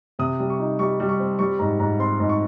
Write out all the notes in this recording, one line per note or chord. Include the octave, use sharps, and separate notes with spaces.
C3 D#6
G3
C#6
D#4
G3 C#6
G3
C#6
C4
G3 C#6
G#2 A#5
G#2 A#5
C4 C6
G#2
C#6